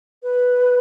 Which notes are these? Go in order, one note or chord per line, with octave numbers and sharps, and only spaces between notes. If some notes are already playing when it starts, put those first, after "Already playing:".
B4